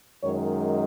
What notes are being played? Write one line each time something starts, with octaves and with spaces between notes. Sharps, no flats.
F#2 D#3 G#3 C#5